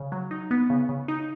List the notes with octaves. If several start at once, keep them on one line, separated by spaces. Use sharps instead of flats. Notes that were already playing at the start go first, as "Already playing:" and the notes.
Already playing: C#3
F#3
D#4
B3
C#3
C#3
D#4